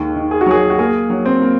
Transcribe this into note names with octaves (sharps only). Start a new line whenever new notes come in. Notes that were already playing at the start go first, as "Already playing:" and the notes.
Already playing: D#2 D#3 G#3
D#3
G#4
F#4
F#3 G#4
F#4
A#3 G#4
F#3
C4
A#3